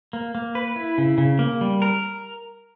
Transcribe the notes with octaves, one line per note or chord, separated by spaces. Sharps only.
A#3
A#3
B4
E4
C#3
C#3
A#3
G3
A#4